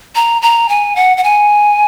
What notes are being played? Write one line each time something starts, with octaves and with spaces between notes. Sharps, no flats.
A#5
A#5
G#5
F#5
F#5
G#5